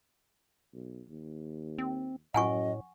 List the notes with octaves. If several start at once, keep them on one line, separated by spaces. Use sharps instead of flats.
B1
D#2
C4
F#2 A2 D#5 F#5 G#5 C#6